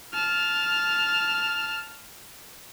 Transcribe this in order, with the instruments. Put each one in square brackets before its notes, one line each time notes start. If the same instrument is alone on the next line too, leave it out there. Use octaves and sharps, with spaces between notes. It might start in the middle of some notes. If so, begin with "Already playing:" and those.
[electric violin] A5 F6